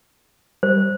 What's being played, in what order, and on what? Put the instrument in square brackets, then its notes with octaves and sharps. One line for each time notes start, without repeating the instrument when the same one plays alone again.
[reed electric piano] G3 [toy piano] C5